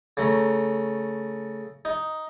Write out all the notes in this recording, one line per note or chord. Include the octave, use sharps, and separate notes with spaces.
C#3 A3 A#5
D#4